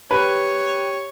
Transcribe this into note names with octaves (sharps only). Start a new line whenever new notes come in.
G4 B4 C#5